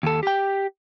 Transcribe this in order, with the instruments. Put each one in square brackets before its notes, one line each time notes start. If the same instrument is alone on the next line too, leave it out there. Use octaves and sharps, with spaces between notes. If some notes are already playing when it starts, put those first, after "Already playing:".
[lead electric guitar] D#2 A4
G4 G5